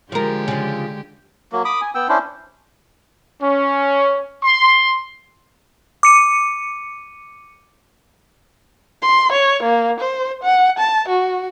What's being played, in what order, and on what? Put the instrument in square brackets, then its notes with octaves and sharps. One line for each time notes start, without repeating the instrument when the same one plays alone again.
[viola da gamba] D3 G#3 G4 [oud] F3 A#4
[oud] C#3 F3
[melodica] F#3 A#3
B5 D6 D#6
G#5
B3 G5 E6
C#4 D4 E4 C5
[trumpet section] C#4
C6
[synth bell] D6 C#7 D#7
[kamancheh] C6
C#5
A#3
C5
F#5
A5
F#4